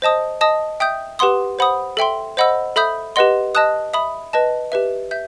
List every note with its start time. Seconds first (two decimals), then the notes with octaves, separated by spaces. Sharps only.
0.02 C5 D#5 A5 D#6
0.41 D#5 A5 D#6
0.80 E5 G5 D#6 G6
1.19 G4 B4 F#5 C6 D#6
1.59 C5 F#5 B5 D#6
1.97 A4 E5 G5 C6
2.37 C5 D#5 F#5 B5 E6
2.76 A4 E5 B5 D#6 G6
3.16 G4 B4 D#5 F#5 C6
3.55 D#5 A5 D#6 F#6
3.93 E5 B5 D#6
4.33 B4 D#5 A5
4.72 G4 B4 E5
5.11 E5 G6